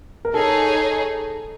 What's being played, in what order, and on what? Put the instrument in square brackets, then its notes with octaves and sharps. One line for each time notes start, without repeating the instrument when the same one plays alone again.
[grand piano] A#4
[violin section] D#4 G#4 C#5 [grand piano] A4